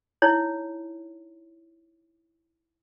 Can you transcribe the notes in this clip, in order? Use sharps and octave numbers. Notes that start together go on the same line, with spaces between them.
D#4 E4 C#5